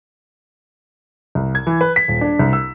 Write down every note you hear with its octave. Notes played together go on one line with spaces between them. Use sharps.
C2
G#6
E3
B4
B6
D#1
D4
C2
E6